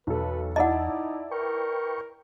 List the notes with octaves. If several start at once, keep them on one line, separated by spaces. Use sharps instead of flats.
B1 E2 A4 B4
D#4 E4 D5 D#5 F#5 A5
A#4 B4 G5 C#6